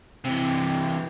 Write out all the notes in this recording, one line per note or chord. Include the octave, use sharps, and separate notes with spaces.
C3 E3